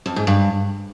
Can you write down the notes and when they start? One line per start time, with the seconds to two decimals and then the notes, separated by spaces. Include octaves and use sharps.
0.06 F2
0.16 G#2
0.27 G2